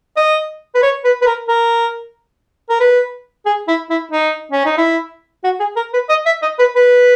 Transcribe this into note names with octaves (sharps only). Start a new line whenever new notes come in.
D#5
B4
C#5
B4
B4
A#4
A#4
A#4
B4
G#4
E4
E4
D#4
C#4
D#4
E4
F#4
G#4
A#4
B4
D#5
E5
D#5
B4
B4